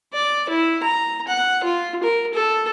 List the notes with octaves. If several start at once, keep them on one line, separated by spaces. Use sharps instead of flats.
D5
E4
A#5
F#5
F4
A#4
A4